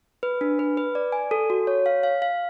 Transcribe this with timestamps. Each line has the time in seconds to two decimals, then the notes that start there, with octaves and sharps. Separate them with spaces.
0.23 B4
0.41 D4
0.59 B4
0.77 B4
0.95 D5
1.12 G#5
1.31 A4
1.50 F#4
1.67 C#5
1.86 F5
2.03 F5
2.22 F5